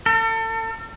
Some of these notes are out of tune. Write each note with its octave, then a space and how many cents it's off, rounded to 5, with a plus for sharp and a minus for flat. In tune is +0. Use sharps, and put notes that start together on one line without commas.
A4 +35